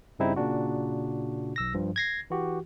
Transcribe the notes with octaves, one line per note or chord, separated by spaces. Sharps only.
G2 C#3 G3 C4 D#4 E4
A#2 C#3 D4 F#4
B1 E6 A#6
G2 F3
G#6 A#6 C7
E3 F#4 G4